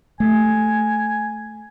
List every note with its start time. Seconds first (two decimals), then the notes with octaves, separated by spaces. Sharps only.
0.20 A3 G#5